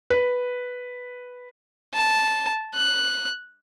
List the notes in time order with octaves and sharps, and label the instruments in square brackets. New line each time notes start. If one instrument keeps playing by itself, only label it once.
[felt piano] B4
[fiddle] A5
F#6